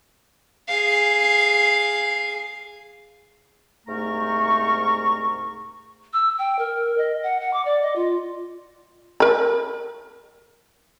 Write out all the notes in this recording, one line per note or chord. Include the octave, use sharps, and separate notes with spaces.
G#4 F5
C2 G#2 A3 A#4 A#5 C#6
E6
G5
A#4
D#5
F#5
F#5
D6
D5
D#5
F4
A#4 B5